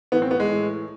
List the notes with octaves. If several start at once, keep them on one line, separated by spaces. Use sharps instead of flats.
A2 E3 B3
C4
B3
G#3
A2 E3